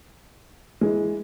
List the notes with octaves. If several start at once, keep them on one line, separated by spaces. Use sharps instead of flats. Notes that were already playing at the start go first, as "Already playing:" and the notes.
E3 G#3